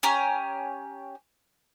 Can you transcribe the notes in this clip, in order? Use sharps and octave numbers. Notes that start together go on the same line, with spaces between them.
C#4 G4 G#5 A#5